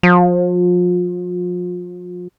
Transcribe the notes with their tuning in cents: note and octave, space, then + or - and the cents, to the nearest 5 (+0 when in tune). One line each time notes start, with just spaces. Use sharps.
F3 +35